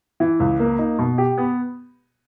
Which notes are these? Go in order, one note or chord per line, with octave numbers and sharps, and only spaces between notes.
E3
C#2
A#3
D#4
B2
G4
B3